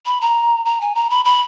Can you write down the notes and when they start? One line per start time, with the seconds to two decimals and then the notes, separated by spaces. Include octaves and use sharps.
0.06 B5
0.21 A#5
0.65 A#5
0.81 G#5
0.95 A#5
1.10 B5
1.25 B5